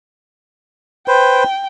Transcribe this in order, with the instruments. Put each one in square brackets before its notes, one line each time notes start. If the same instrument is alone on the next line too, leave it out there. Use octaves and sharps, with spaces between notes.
[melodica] B4 C5 [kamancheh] G5